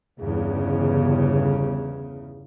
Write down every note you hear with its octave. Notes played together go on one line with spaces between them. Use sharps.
G1 E2 C#3